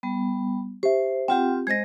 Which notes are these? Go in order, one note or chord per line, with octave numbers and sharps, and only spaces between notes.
G3 B3
G4 C5 E5
C4 F4 G4 F#5 G5
G#3 C5 D#5 G#6 A#6